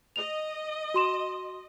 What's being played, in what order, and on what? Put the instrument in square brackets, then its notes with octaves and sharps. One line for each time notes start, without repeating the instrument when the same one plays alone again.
[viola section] D#5 [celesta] F7
[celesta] F#4 C6 E7